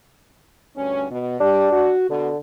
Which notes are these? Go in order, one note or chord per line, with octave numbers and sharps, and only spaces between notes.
D2 G2 C#4
B2
G3 D4 G4
F#4
B2 D3